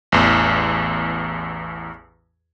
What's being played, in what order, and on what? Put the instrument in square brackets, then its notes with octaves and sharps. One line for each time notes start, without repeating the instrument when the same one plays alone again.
[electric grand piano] A1 E2